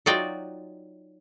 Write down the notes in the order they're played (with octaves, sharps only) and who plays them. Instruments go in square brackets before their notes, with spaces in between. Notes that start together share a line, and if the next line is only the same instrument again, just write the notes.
[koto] F#3 D#4 F4 F#4 D5 G5